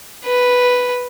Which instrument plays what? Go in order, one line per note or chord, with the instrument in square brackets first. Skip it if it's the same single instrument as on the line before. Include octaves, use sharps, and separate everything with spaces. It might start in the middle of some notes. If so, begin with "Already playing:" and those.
[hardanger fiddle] B4